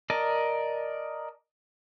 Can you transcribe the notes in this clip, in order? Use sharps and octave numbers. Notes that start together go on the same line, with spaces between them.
A#4 D5 D#5 A5